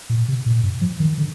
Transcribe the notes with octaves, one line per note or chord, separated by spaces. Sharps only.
A#2
C3
A#2
G2
F3
D#3
D3